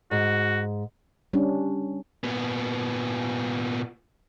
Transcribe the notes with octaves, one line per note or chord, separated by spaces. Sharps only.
G#2 F#4
G3 C#4 D4
A#2 B3